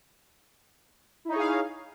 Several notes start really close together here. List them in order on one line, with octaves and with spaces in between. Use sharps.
E4 D#4 C#5 G#4 F5